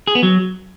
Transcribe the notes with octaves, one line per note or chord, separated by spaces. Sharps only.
G#4
B3
F#3